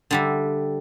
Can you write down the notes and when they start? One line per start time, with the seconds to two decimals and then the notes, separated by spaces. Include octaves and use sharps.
0.11 D3 G3 E5